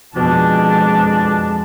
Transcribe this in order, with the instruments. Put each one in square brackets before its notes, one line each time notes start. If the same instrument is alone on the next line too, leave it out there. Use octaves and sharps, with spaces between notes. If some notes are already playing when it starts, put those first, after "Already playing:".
[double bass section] F2 G#3 [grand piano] B2 [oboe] D4 [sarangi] A5